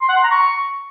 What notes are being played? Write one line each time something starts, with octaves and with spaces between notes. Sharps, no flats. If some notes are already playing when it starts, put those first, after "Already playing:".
C6
F#5
C6
A#5
C#6